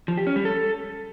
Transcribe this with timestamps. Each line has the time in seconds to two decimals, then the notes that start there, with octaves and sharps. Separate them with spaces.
0.08 F3
0.17 G4
0.27 C#4
0.36 G3
0.45 A4